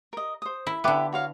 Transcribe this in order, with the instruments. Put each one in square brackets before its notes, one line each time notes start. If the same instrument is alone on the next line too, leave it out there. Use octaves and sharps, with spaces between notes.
[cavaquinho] A#4 D#5
C5 D#6
[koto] E4
[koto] D3 B3 [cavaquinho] E4 G4 D6
[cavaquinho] F#4 C#5 F5